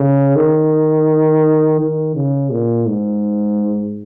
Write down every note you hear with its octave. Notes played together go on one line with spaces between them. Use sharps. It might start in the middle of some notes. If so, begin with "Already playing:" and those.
Already playing: C#3
D#3
D#3
C#3
A#2
G#2